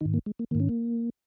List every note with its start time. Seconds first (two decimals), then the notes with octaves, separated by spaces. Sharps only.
0.01 G#2 D#3 D#4
0.14 A#3
0.26 G#3
0.39 A#3
0.51 G#2 D#3 A#3
0.60 C#4
0.69 A#3